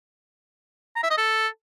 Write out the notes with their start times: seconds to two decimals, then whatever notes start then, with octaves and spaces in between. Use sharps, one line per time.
0.96 A#5
1.03 E5
1.10 D#5
1.18 A4